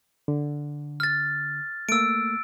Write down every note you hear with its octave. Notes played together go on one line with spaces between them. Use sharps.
D3
F6 A6
A3 A#3 E6 D7